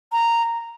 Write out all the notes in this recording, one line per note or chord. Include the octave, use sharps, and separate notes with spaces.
A#5